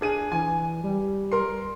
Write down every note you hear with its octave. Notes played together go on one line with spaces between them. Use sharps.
D4 G#4 D#7
E3 G#5
G3
A#4 C6